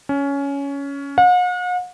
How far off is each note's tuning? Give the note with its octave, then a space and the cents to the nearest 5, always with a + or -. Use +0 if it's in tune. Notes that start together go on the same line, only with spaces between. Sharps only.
C#4 +15
F#5 -45